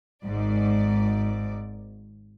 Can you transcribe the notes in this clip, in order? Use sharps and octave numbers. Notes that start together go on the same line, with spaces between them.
G#1 G#2 D5